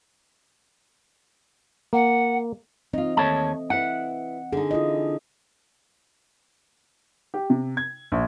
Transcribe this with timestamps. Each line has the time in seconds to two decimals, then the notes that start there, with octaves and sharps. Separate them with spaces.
1.93 A#3 F#5
2.93 E3 C4 D#4 F4 D#5
3.17 D#2 A3 C#5 A5
3.70 E4 B4 F#5
4.53 D3 D#4 G#4
4.71 E4 F4 D#5
7.34 G4
7.50 C3
7.77 G#6
8.12 A#1